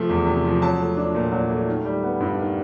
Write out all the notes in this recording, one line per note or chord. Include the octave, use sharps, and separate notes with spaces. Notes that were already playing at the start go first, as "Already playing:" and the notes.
Already playing: C3 F3 A3
E2
C3
F3
F#3 A5
A3
D4
A#2
F#3
A3
D#3
G3
B3
G2
D#3